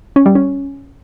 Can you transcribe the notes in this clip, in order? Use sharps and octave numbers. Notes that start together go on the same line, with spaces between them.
C#4
G3
C#4